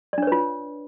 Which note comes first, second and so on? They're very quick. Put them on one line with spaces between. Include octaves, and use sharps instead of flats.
D5 D4 C#5 B4 F4